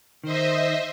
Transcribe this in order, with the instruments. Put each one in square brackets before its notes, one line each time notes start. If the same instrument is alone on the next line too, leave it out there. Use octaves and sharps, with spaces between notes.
[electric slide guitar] D#3 [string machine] C5 D#5 E5